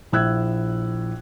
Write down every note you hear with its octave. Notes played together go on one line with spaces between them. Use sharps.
A#1 E4 E6 F#6 G#6